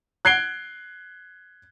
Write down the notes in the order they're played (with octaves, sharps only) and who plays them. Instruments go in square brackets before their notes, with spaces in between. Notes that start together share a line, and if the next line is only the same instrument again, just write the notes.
[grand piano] F#6 G#6 C7 D7 G7